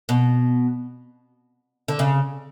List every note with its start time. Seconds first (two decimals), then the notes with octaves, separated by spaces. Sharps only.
0.09 B2
1.88 D3
1.99 C#3